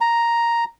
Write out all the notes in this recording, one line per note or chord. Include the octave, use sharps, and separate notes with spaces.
A#5